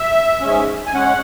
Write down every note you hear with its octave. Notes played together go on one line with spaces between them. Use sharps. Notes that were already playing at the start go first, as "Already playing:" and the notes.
Already playing: E5
G#2 G#3 C#4
G#5
G#3 C#4 F#5